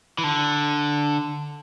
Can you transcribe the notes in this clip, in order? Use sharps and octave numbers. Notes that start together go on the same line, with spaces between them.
E3
D3